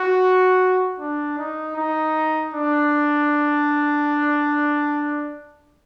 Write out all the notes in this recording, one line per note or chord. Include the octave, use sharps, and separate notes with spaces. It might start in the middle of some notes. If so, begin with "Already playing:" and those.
Already playing: F#4
D4
D#4
D#4
D4